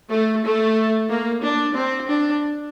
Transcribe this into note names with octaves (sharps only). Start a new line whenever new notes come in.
A3
A3
A#3
D4
C4
D4